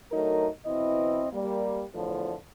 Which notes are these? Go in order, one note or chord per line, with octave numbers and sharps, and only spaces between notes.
D2 F#3 A3 D#4 A#4
B2 E3 C4 E4 D#5
G3 A#3
E2 A2 D3 F3